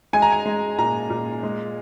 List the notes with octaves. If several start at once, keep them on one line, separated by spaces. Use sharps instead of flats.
G#3 G#5
A#5
G#5
G#3
A#2 A#5
A#2
G#3